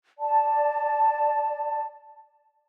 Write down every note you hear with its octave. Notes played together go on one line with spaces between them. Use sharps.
D5 A5